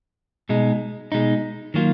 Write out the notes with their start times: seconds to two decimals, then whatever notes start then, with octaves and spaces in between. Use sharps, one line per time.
0.49 B2 G#3 D#4
1.12 B2 G#3 D#4
1.74 D#3 F#3 A#3 F4